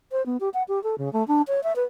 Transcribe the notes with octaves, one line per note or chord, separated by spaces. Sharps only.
C5
B3
G4
F#5
G4
A4
C#3
A3
D4
C#5
E5
B4